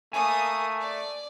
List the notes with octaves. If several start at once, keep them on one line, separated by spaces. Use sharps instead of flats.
A3 A#3 G#5 D#6
D5